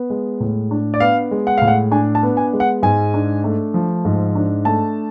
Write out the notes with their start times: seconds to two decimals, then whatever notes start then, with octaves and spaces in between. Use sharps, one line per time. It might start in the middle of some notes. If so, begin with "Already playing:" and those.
Already playing: B3
0.10 G#3
0.40 A2
0.71 D4
0.94 D5
1.00 B3 F5
1.31 G#3
1.47 F#5
1.58 A2 F5
1.68 F#5
1.91 D4 G#5
2.15 A5
2.23 B3
2.37 G#5
2.53 G#3
2.60 F#5
2.83 G#2 G#5
3.14 D4
3.44 A3
3.74 F3
4.05 G#2
4.35 D4
4.65 A3 A5